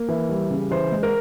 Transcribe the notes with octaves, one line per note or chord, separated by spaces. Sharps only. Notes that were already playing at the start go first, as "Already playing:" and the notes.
Already playing: A#3
E3
G3
C#3
E3 C5
G#3
A#4